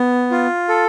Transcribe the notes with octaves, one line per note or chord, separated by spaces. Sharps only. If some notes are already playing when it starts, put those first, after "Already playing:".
Already playing: B3
F4
A4